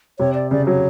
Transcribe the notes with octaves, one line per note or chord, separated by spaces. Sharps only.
C3 C#5
D5
C#3 D5
F#3 C#5